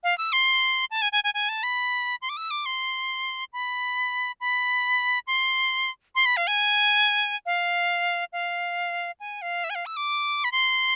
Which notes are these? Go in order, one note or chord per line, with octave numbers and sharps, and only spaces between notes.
F5
E6
C6
A5
G#5
G#5
G#5
G#5
A5
B5
C6
D6
E6
D6
C6
B5
B5
C6
C6
B5
F5
G#5
F5
F5
G#5
F5
E5
G#5
F5
E6
D6
B5
C6